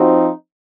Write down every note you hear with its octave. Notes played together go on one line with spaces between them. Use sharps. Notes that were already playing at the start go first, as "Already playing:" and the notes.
Already playing: F3 C4 D#4 F#4